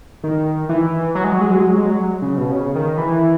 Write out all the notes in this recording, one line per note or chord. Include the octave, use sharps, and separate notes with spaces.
D#3
E3
F#3
G#3
F#3
G#3
F#3
G#3
F#3
G#3
F#3
C#3
B2
C#3
D#3
E3